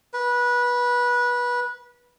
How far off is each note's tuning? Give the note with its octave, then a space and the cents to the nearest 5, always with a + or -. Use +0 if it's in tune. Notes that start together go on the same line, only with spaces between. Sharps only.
B4 -20